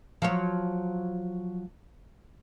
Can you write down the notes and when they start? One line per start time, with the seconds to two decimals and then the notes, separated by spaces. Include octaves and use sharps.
0.22 F3 F#3 C#5